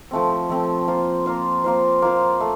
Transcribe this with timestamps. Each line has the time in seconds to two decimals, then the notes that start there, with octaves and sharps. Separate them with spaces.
0.11 F3 A3 C4
0.49 F3 A3 C4
0.88 A#3 F4 C5
1.26 A#3 F4 C5
1.64 A#3 F4 C5
2.02 A#3 F4 C5
2.40 A3